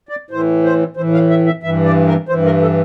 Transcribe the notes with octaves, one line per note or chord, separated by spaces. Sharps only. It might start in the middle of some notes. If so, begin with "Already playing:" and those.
D5
A2 E3 C5
C5
A2 E3 C5
F5
E5
E5
G2 E3 E5
D5
A#4
G2 E3 C5
A#4
A4